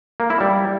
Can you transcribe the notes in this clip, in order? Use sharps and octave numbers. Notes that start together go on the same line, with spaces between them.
A#3
E4
G3